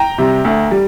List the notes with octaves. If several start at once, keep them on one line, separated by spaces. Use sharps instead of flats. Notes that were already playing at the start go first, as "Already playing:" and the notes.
Already playing: G5 A#5
C3 G3
D2
G3